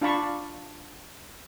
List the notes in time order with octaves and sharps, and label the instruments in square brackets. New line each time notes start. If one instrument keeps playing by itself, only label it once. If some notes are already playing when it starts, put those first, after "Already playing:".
[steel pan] D4 F4 F5 A5 B5 C#6